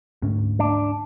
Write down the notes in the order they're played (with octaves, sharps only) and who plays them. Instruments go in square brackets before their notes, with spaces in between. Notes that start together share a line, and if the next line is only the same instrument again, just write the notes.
[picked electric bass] D2 G#2 C#4
[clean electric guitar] D4